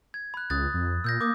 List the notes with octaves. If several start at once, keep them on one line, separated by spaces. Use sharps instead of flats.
G#6
B5 F#6
C#2 D#6 F#6 A6
F2
A#2 E6 G6 A#6
A#3 D6 D#6 G6